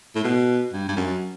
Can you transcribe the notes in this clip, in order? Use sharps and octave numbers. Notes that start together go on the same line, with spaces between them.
A2
B2
G2
G2
F#2